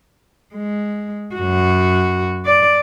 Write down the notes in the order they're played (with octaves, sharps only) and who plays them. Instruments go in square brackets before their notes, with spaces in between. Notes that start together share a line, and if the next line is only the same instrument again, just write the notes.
[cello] G#3
F#2 F#4
D5